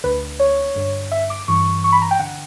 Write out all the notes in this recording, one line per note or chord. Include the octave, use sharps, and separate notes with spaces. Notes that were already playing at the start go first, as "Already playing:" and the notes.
D2 D3 B4
C#5
G2 D3
E5
D6
G2 E3 C#6
C#6
B5
A#5
G5
D3 F#5